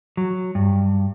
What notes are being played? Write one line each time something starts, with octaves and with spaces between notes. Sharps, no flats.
F#3
G2